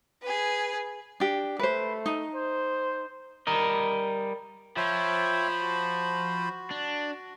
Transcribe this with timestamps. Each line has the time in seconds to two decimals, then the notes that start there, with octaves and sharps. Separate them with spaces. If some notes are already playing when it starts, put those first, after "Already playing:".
0.23 G#4 B4
1.20 D4 G4
1.59 A3 B4 C5
2.06 D#4
2.35 C5
3.47 G3 A#4 D#5
4.77 F3 C5 C#5 E5 G5 B5
5.62 F#4
6.71 D4